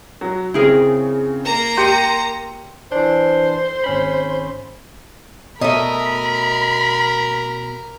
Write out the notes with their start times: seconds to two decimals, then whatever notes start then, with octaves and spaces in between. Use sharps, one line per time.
0.21 F#3 F#4
0.54 C#3 C4 E4 G#4 A#4
1.45 A#3 A#5
1.77 G4 C6 C#7 D#7
2.92 E3 D4 C5
3.84 G#1 C#4 B5
5.61 B2 A3 A#4 D#5 E5 B5